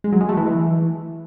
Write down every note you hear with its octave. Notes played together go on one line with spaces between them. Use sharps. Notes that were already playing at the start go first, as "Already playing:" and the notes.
G#3
F#3
G#3
A3
E3